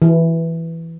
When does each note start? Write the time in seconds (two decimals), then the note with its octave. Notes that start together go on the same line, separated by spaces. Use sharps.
0.02 E3